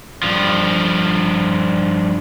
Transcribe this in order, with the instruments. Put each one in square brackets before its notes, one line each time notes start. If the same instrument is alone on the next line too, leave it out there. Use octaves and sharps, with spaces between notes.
[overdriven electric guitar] G2 F3